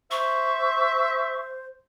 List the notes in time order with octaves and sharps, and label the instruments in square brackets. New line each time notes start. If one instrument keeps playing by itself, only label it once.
[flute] C5 [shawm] E5 [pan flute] C#6